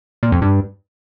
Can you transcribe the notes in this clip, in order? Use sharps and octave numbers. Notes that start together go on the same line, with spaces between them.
A#2
F2
G2